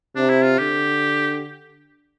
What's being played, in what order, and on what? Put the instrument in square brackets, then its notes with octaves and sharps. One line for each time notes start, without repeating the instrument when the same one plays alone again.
[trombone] C3 [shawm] D4
[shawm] E4
F4
[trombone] D3 [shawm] G4